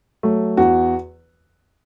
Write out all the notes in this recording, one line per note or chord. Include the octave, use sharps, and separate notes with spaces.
F#3 A3
E2 F#4